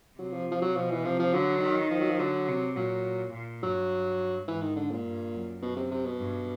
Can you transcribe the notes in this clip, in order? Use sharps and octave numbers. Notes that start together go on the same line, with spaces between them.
C3 F#3
F3
F3
F#3
B2 F3
E3
C3 F3
F3
D3 F#3
D#3
F3
F#3
F3
D3 F#3
C3
A#2 F#3
A#2
G2 F#3
G#2 E3
D#3
D3
A#2
G2
F#2
B2
C3
C3
B2
G2